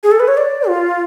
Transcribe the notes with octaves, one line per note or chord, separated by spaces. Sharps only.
G#4
A4
B4
C#5
D5
F4